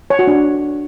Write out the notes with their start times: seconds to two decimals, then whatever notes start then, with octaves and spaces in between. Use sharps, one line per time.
0.10 C#5
0.19 F#4
0.27 D4